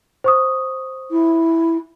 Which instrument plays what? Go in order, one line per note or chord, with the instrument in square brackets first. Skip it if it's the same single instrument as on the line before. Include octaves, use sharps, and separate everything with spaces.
[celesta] C5 C#6 D#6
[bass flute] E4